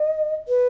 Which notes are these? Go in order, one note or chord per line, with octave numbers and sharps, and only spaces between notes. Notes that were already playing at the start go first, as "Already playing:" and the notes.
Already playing: D#5
B4